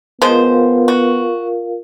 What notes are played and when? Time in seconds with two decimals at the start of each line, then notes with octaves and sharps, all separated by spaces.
0.22 F3 G#3 B3 F4 A#4 C5 F5
0.88 F#4